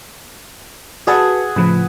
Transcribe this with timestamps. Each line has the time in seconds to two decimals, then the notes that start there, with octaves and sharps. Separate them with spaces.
1.07 F#4 G#4 B4 E5 F#5 A5
1.56 A2 C#3 F3 B4